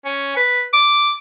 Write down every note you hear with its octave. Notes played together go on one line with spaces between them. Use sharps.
C#4
B4
D6